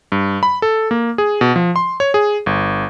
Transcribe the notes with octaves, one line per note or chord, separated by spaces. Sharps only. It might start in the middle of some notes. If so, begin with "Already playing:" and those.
G2
B5
A4
A#3
G#4
B2
F3
C6
C#5
G#4
G1